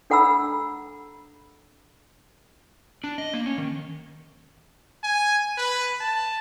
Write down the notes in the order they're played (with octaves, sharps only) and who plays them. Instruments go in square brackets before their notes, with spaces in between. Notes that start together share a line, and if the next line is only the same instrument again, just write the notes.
[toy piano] D4 A4 F#5 A#5 B5 E6
[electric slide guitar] D4
D#5
A#3
C#4
D#3
[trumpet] G#5
B4
A5